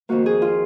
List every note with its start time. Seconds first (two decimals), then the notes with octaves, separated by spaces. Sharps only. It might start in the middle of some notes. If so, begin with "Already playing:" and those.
0.09 F2 D#3 A#3 F#4
0.26 G#4
0.42 F4